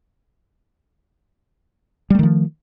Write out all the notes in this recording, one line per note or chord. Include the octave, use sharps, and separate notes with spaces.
D#3 F3 G3 A3